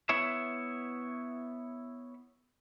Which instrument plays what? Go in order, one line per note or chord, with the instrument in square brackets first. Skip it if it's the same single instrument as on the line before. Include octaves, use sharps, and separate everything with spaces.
[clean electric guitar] B3 E4 C#5 E5